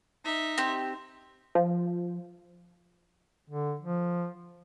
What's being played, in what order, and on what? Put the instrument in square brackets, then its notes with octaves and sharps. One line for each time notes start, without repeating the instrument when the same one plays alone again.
[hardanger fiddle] D#4 E5
[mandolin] C4 G4
[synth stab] F3
[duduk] D3
F3